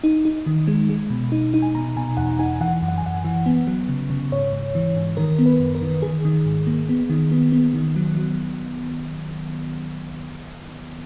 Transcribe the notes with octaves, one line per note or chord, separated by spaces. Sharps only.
D#4
D#4
D#3
G#3
G#3
B2
D#4
D#4
G#5
B2 A#5
B2 G#5
E2 F#5
D#4 G#5
E3 F#5
F#2
F#5
G#5
F#2 F#5
E3
B3
F#3
C#3
C#3
G#2 C#5
G#2
E3
G#2
D#3 A#4
B3
B4
F#2
A#4
D#3
D#3 G#4
D#3
G#2
A#3
B3
D#3
B3
B3
D#3
F#3
F#3